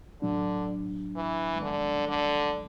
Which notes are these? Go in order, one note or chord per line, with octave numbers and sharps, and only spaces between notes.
A2 D3 F#3 D4
E3
D3
D3